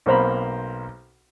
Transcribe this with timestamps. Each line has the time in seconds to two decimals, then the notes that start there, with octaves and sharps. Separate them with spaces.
0.06 B1 A#3 C4 C5 A#5 B5